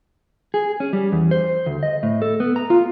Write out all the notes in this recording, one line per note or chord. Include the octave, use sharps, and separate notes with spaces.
G#4
C#4
G3
E2
C5
D2
D#5
A2
A4
B3
A#5
F4